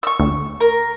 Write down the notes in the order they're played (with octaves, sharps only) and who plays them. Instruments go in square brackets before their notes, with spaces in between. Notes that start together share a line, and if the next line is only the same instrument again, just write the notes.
[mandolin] C#6 E6
[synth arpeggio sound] D2
[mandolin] A#4